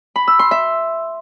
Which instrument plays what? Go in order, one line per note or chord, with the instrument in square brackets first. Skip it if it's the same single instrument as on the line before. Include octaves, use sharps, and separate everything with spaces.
[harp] B5
E6
C6
E5